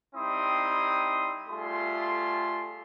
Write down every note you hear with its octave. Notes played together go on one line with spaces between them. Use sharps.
G3 C4 D#4 E4 C6 D#6
G3 A3 F4 G#4 C6